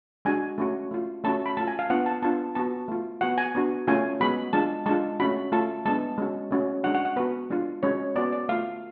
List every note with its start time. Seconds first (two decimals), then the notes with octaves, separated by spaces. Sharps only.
0.25 G#3 D4 F#4 G#5
0.58 A3 C#4 F#4
0.91 A3 F4
1.24 A3 C#4 F#4 A5
1.46 B5
1.57 A3 A5
1.60 F4
1.68 G#5
1.79 F5
1.90 B3 D4 F4 F#5
2.06 A5
2.22 B3 D4 F4 A5
2.55 B3 F#4 A5
2.88 A3 F4
3.21 B3 F#4 F#5
3.38 G#5
3.55 B3 D4 F#4
3.87 A3 C#4 F4 G#5
4.20 G#3 B3 F#4 B5
4.53 G#3 D4 F4 A5
4.86 G#3 D4 F4 A5
5.20 A3 C#4 F#4 B5
5.52 A3 F4 A5
5.85 G#3 B3 D4 A5
6.18 G#3 C#4 F#4
6.51 A3 C#4 F#4
6.83 G#3 D4 F#4 F#5
6.95 F#5
7.05 F#5
7.16 B3 F#4 B4
7.50 G#3 D4 F4
7.83 G#3 C#4 F#4 C#5
8.16 B3 F#4 D5
8.33 D5
8.49 A3 F4 F5